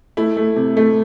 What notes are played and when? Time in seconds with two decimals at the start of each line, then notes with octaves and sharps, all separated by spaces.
0.17 A3 E4
0.37 A3
0.56 C3
0.77 A3